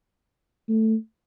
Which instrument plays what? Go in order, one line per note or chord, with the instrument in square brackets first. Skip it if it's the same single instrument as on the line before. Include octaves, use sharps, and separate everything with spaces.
[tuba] A3